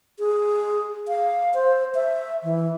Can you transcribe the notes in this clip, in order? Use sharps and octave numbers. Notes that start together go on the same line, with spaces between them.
G#4
F5
C5
E5
E3